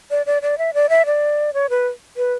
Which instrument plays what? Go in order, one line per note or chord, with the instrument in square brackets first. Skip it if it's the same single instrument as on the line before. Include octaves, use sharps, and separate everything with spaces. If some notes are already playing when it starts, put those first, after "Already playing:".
[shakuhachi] D5
D5
D5
E5
D5
E5
D5
C#5
B4
B4